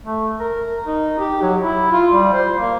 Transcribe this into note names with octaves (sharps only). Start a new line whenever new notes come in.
A3
A#4
D#4
G4
F#3
E4
F4
G3
C5
A#3